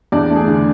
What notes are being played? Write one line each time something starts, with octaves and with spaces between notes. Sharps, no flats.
E2 D4 D5
A3
G#4
D3